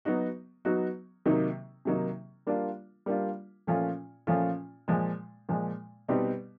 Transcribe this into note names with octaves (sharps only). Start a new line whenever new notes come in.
F#3 B3 D#4 F#4
F#3 B3 D#4 F#4
C3 D#3 F#3 A#3 D#4
C3 D#3 F#3 A#3 D#4
G3 A#3 D4 F4
G3 A#3 D4 F4
A#2 F3 A3 C#4 F4
A#2 F3 A3 C#4 F4
A#2 F3 G#3
A#2 F3 G#3
B2 G3 C4 D#4 G4